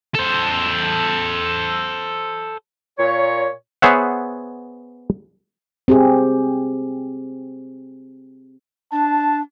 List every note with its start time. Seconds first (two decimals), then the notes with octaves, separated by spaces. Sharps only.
0.15 A4 C5
2.99 A#2 C#5
3.82 B3 G#4 C5 C#5 E5 F#5
5.88 C4 G4 G#4
8.92 D4 A5